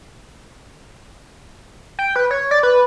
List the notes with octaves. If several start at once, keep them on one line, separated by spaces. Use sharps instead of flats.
G5
B4
C#5
D5
B4